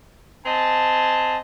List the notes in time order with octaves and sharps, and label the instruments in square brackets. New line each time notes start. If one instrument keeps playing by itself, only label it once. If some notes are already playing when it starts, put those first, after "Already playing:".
[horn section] C4 D#5 G#5 A5